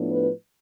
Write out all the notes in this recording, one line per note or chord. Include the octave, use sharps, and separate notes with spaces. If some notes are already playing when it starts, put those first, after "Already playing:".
Already playing: A2 F3 B3 D4
B4